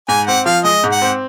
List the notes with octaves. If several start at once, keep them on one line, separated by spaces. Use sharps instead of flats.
G#2 G#5
C4 F#5
F3 F5
G#3 D#5
G#2
F#5
C4